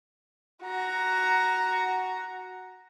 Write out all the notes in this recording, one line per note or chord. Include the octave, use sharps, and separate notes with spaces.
F#4 A#5